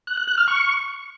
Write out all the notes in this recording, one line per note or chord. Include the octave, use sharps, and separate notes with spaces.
F#6
F#6
F#6
F6
C#6